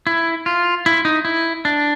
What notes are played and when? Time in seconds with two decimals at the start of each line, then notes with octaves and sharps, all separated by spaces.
0.07 E4
0.46 F4
0.86 E4
1.05 D#4
1.25 E4
1.65 D4